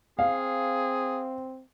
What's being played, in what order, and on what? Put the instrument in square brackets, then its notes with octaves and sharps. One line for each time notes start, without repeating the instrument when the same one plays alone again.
[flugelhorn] C4 [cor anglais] G#4 [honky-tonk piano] F5